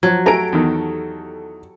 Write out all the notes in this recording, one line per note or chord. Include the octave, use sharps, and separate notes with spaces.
F3 F#3
A3 G4 A4 G#5 A#5 D7
E2 D#3